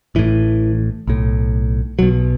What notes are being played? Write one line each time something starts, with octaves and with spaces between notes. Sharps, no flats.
A1 A2 E3
B1 A2
B1 B2 F#3